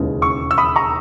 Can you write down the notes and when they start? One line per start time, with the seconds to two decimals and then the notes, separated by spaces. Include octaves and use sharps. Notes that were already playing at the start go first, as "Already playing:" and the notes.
Already playing: E1 D#2 C#3 E3 G#3
0.22 C#6 E6
0.51 E6
0.58 B5 D#6
0.76 A#5 C#6